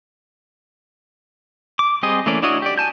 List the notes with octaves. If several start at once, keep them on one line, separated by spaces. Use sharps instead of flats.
D6
G3 C4 G4 G#4 D#5
E3 A3 A#3 C#4 D5
D4 E4 F#4 C#5 D#5
G4 D5
G#5 A5 G6